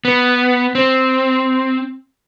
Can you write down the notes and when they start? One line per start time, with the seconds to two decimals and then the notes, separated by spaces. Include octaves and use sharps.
0.05 B3
0.75 C4